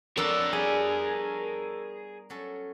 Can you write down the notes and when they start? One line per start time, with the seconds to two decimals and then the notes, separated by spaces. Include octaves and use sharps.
0.17 F2 B3 D4 A4 A#4 C#5 E6
0.53 G3 G#4
2.30 F#3 C#4 A4